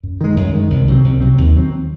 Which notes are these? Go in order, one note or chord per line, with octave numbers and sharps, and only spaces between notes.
F#2
D#3 G#3
F#2
D#3 G#3
C2
C3 F#3 C4
C2
C3 F#3 C4
D#2
D#3 F#3 C4